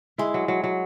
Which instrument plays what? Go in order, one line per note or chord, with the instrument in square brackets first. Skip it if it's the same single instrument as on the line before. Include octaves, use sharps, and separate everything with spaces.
[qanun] G#3 [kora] E4
[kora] F#3
F#3
F#3